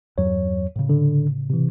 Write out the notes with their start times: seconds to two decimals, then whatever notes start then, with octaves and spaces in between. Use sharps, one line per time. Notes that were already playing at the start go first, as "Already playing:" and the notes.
0.18 E2 G2 F#3 C#5
0.76 A2 C#3
0.89 D3
1.50 C3 E3